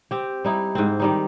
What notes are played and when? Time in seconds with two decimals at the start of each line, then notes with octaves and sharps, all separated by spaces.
0.11 C4 G4
0.45 G3 D#4 E4
0.75 G#2 C4
1.00 D#3 G3 D#4